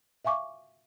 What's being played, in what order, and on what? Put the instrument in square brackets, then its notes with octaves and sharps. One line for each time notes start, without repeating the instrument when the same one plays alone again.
[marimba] E5 F5 G#5 C#6 D6